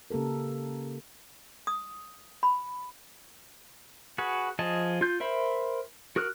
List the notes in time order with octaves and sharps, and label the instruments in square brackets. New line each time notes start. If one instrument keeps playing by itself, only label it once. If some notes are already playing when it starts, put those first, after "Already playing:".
[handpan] C#3 A#3 G4 A4 A#4
[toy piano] D#6
B5
[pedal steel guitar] F#4 G#4 B4
F3 G#4 D#5 A5
F4 G6
A#4 C5 E5 B5
F#4 A#4 D#6 F6 F#6